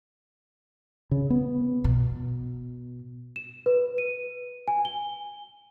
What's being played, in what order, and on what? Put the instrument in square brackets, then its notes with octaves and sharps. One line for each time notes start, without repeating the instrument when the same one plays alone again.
[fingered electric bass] C#3
B3
[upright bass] B2
[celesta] E7
B4
D#7
G#5
G7